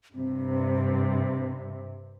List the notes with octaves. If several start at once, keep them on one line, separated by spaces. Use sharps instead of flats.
G2 C3 C4